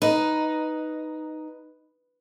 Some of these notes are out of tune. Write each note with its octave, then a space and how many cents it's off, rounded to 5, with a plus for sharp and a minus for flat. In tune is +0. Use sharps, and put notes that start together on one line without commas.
D#4 +0 B4 +0